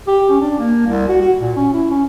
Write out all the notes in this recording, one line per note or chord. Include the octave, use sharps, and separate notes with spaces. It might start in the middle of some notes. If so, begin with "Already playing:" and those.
G4
C#4
D4
A#3
C2
F#4
F#4
A#2
C#4
E4
C#4